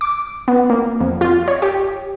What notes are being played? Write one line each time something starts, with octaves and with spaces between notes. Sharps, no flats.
D6
B3
A#3
F2
F4
C#5
G4